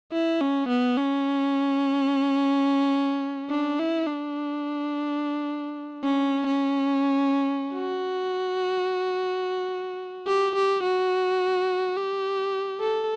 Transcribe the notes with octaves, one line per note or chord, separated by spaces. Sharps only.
E4
C#4
B3
C#4
D4
E4
D4
C#4
C#4
F#4
G4
G4
F#4
G4
A4